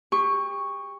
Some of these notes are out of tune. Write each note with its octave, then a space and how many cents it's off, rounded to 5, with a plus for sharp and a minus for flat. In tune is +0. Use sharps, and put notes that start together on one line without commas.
G4 +35 C#6 +0